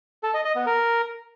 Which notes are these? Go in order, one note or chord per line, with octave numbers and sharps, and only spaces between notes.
A4
D#5
D#5
B3
A#4